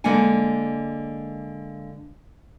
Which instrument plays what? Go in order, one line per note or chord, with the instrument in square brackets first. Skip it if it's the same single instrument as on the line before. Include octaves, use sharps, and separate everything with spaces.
[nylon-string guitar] D3 G#3 A#3 F#5 G#5